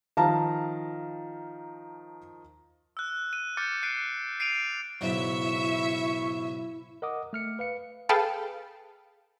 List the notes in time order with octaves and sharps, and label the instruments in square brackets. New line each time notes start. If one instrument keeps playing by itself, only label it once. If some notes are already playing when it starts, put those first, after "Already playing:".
[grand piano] D#3 F3 [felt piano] F5 A5 A#5
[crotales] E6 F#6
D#7
D6 F6 G6 A6 C#7
F#6 C7 D7 D#7
C7 D7 D#7 F7
[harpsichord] B1 G#2 C#3 [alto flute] E4 [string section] E5 [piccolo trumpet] C#6
[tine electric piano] A#4 D#5 F#5 D6 D#6
A3 F6 C#7
B4 F5 C#7
[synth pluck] G#4 A4 B4 F5 G5 A5